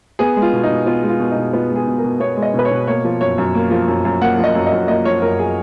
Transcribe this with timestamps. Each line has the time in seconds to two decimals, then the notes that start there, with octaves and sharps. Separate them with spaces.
0.19 B3 G#4
0.36 G#3
0.42 F4
0.53 B2
0.63 D#4
0.69 B2
0.86 B3 F4
1.03 G#3
1.09 F4
1.19 B2
1.31 D#4
1.37 B2
1.53 B3 F4
1.70 G#3
1.75 G#4
1.87 B2
1.98 A#4
2.04 B2
2.20 B3 C#5
2.37 G#3
2.42 D#5
2.54 B2 B4
2.65 C#5
2.71 B2
2.87 A#3 C#5
3.05 F3
3.21 F#2 C#5
3.38 F#2
3.55 A#3
3.71 F3
3.88 F#2
4.05 F#2
4.21 A#3 F#5
4.38 F3
4.44 D#5
4.55 F#2
4.66 D#5
4.72 F#2
4.88 A#3 D#5
5.05 F3 C#5
5.22 F#2 A#4
5.39 G#4